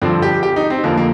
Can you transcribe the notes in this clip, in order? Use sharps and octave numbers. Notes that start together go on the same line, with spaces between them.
G2 D3 F3 C4
G4
G4
D#4
C4
F2 D3 F3 A#3
A#3